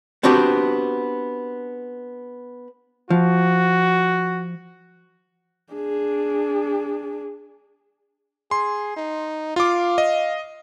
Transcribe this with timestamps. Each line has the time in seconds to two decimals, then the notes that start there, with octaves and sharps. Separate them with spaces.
0.23 B3 C4 D4 F#4 G4
3.10 F3 F#4
5.73 D4 G#4
8.51 G#4 C6
8.96 D#4
9.56 F4 F5 D6
9.98 D#5